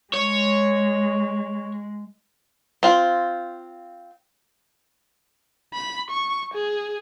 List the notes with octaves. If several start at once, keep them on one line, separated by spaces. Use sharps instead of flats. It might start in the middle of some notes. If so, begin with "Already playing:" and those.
G#3 C#5
C4 F4
B5
C#6
G#4